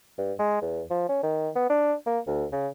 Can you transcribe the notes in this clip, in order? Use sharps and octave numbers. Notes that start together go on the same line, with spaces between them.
G2
G#3
E2
F3
C#4
D#3
B3
D4
A#3
D2
C#3